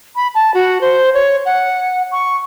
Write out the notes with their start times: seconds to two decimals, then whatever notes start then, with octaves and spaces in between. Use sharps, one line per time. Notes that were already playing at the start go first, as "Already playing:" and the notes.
0.16 B5
0.35 A5
0.54 F#4
0.81 C5
1.14 C#5
1.46 F#5
2.12 C#6